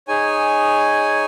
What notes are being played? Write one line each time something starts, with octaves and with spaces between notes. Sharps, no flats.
D#4 G#4 C#5 G#5